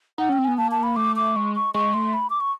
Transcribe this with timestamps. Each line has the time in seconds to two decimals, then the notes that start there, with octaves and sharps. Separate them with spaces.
0.18 D#4 F#5
0.29 C#4 G5
0.38 C4
0.45 B3 G#5
0.58 A#3 A5
0.71 A5
0.83 B5
0.96 A3 D6
1.16 D6
1.36 G#3 C#6
1.55 C#6
1.74 G#3 C#6
1.94 A3 C6
2.13 B5
2.30 D6
2.40 C#6